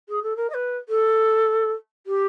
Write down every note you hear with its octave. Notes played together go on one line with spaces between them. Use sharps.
G#4
A4
A#4
D#5
B4
A4
G4